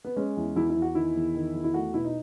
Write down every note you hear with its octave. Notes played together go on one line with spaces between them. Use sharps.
B3
G#3 C#4
E2
E2 E4
E4
E2
F#4
D#3 E4
E2
D#3
E2
E4
A3 F#4
B2 E4
D#4